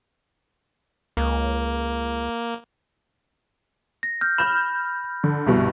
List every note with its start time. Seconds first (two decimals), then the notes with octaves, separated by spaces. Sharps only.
1.17 C#2 A#3
4.03 A#6
4.21 F6 G6
4.38 B5 F6 G6 E7
5.24 D3
5.47 C2 G2 B2